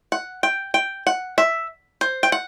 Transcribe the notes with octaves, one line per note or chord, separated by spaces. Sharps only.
F#5
G5
G5
F#5
E5
C5
G5
F#5